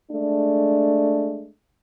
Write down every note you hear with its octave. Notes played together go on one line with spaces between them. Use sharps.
G#3 A3 D4